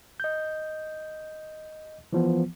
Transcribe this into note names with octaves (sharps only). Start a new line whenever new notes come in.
D#5 G6
E3 F3 B3